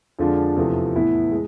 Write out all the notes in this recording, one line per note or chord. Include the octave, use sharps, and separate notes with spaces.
F2 D3 F3 G#3 D4
E2 C3 F3 A3
A2 E3 B3 E4
G#3